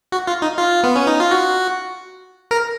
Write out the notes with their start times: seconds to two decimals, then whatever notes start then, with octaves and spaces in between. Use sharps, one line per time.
0.12 F#4
0.27 F4
0.42 D#4
0.58 F4
0.83 B3
0.96 C#4
1.07 D#4
1.20 F4
1.31 F#4
2.51 A#4